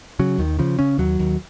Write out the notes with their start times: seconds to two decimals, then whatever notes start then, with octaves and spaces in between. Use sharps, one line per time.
0.19 C#3 F#3
0.38 D#2 D#3
0.59 C#3 F3
0.79 C#3 C#4
0.98 D#2 F#3
1.19 D#2